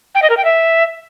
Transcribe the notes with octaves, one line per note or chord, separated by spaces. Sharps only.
G5
D#5
A#4
G5
E5